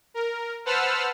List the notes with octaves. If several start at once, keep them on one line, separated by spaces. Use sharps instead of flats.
A#4
B4 C5 F#5 A5 E6 F6